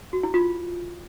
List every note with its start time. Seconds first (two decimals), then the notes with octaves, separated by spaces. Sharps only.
0.13 F#4
0.23 E4
0.34 F4